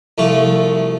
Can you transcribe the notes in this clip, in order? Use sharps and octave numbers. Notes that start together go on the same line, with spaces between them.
C2 F3 A3 C#6